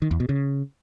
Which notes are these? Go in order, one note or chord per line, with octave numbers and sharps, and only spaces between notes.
D#3
E2
B2
C#3